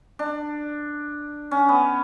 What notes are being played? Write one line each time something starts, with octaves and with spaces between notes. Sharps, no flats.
D4
C#4
B3